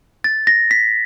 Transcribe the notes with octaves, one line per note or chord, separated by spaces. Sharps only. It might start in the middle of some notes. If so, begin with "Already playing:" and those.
A6
A#6
B6